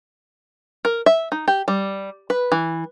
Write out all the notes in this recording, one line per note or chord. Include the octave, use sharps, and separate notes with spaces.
A#4
E5
D#4
G4
G3
B4
E3